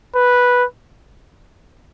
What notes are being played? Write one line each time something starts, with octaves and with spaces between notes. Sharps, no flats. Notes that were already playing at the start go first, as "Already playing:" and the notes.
B4